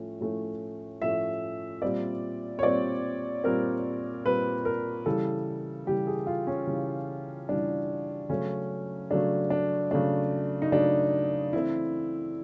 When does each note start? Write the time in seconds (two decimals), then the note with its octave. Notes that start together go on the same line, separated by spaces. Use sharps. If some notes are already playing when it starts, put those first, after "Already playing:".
Already playing: A2 F3 A3 C#4
0.20 A2 F3 A3 C#4
1.02 A2 F3 A3 C#4 E5
1.82 A#2 G3 C4 D5
2.59 C#5
2.63 A#2 G3 C4 D5
3.44 A#2 G3 C4 A#4
4.25 A#2 G3 C4 B4
4.65 A#4
5.06 C#3 E3 G3 A4
5.86 C#3 E3 G3 G4
6.07 G#4
6.27 F4
6.47 C#4
6.67 C#3 E3 G3
7.49 C#3 E3 G3 D4
8.29 C#3 F#3 A3 C#4
9.11 C#3 F#3 A3 D4
9.50 D4
9.91 C#3 F#3 A3 D4
10.62 D#4
10.72 C#3 F#3 A3 D4
11.53 E3 A3 C4 E4